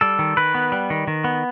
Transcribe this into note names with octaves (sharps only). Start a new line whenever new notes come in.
G3 A4
D#3
D#3 B4
B3
G3
D#3
D#3
B3